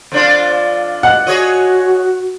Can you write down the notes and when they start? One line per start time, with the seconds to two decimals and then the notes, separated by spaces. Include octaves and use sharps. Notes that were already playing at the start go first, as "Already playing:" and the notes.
0.12 F2 D4 F4
1.03 D#5 F#5
1.27 F#4 G#4 C#5 D#5